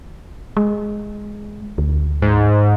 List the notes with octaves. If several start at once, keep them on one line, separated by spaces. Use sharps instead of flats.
G#3
D2
G#2